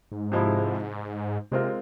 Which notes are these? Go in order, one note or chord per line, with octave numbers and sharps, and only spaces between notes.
G#2
C3 F3 G#3 E4
C3 G#3 C4 F4 A#4